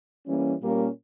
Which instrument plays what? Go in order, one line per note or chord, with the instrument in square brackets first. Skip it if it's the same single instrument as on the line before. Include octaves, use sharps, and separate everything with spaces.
[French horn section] E3 G3 A#3 C#4
A#2 G3 A#3 C#4